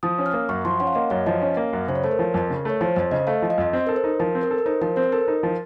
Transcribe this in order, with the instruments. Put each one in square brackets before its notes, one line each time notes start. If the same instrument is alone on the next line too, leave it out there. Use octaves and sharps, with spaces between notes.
[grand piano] F3 [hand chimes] D#6
[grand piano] C#4
[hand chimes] F6
[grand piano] A#3
[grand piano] F#2 [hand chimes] C#6
[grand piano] F3 [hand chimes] C6
[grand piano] C#4 [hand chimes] F#5
[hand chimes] F5
[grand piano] A#3 [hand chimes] D#5
[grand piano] F#2 [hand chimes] C#5
[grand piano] F3 [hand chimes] D#5
[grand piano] C#4
A#3
F#2
[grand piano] C#3 [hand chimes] C5
[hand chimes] C#5
[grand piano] A3 [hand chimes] C5
[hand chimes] A#4
[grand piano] F3
F2
C#3
[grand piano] A3 [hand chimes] C#5
[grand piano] F3 [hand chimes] C5
[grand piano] F2 [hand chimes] C5
[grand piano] C#3 [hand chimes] D#5
[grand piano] A3 [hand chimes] F5
[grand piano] F3
[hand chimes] D#5
[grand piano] F2
C4
[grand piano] A4 [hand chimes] A#4
[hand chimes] C5
[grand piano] D#4
[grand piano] F3 [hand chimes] A#4
[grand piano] C4
[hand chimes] A#4
[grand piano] A4
[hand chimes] A#4
[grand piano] D#4 [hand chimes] C5
[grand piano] F3 [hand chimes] A#4
[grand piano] C4 [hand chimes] C5
[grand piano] A4 [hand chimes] A#4
[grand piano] D#4
F3